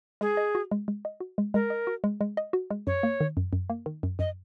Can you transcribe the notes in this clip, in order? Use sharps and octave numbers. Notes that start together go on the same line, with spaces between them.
G#3 G#4
D#5
F#4
G#3
G#3
D#5
F#4
G#3
G#3 A#4
D#5
F#4
G#3
G#3
D#5
F#4
G#3
F#2 C#5
A#3
D#3
F#2
F#2
A#3
D#3
F#2
F#2 D#5